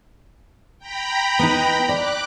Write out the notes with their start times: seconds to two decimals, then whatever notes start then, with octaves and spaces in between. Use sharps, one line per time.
0.79 G5 A#5 B5
1.39 B3 D#4
1.89 D5 D6 F#6